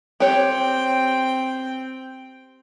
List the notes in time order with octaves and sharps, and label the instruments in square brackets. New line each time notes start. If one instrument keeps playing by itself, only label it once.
[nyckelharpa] C4 G5 [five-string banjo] G4 C#5